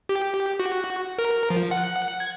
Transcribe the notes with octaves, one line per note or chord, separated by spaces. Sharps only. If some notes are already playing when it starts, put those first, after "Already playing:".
G4
F#4
A#4
F3
F#5
G#6